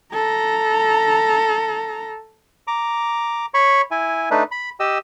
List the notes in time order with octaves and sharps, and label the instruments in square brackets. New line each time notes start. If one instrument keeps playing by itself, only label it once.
[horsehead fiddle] A4 A#5
[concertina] A#5 D6
C#5 B5 C#6
E4 G#5
A3 D4 D#4 B4
B5
G4 D#5 E6